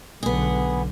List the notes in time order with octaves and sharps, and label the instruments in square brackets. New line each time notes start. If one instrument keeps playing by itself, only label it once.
[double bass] B1 D3 [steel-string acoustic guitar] B3 G#4